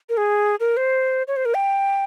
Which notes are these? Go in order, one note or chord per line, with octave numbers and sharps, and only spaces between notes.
A#4
G#4
A#4
C5
C#5
C5
A#4
G5